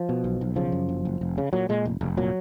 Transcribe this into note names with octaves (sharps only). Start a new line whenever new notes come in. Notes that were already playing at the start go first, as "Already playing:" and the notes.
Already playing: F3
B2
B1
B1
C#3 F3
F#2
F#1
F#1
F1
C#3
A#2 F#3
A#2 G#3
F1
F1
A#2 F#3